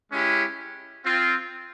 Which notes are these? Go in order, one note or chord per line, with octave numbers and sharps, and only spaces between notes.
G#3 C#4 E4 G4
C4 F4